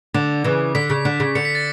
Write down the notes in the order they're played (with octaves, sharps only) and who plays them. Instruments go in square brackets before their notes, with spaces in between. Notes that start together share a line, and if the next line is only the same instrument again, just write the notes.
[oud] D3 [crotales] D6
[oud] C#3 E3
[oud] D3 [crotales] B6
[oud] C#3
D3
C#3
[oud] D3 [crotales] C#7
[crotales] B6
A6